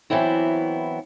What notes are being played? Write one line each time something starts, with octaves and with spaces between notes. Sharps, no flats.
E3 F#3 B3 C4 E4